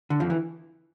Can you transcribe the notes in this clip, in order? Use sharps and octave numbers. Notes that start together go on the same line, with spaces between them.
D3
F2 F3
E3